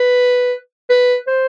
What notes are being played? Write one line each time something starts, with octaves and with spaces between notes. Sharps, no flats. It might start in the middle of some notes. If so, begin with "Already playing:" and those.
Already playing: B4
B4
C5